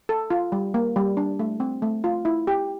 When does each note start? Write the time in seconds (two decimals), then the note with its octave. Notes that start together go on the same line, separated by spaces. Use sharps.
0.09 A4
0.31 F4
0.52 G3
0.74 A#3
0.96 G3
1.17 D4
1.39 A3
1.60 C4
1.82 A3
2.04 F4
2.25 E4
2.47 G4